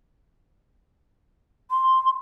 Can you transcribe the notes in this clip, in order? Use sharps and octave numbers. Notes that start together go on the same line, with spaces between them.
C6